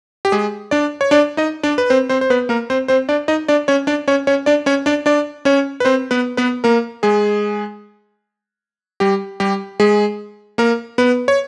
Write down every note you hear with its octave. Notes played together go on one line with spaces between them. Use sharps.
G4
G#3 G#4
D4 D5
C#5
D4 D5
D#4 D#5
D4 D5
B4
C4 C5
C4 C5
C5
B3 B4
A#3 A#4
C4 C5
C4 C5
D4 D5
D#4 D#5
D4 D5
C#4 C#5
D4 D5
C#4 C#5
C#4 C#5
D4 D5
C#4 C#5
D4 D5
D4 D5
C#4 C#5
B4
C4 C5
B3 B4
B3 B4
A#3 A#4
G#3 G#4
G3 G4
G3 G4
G#3 G#4
A#3 A#4
B3 B4
C#5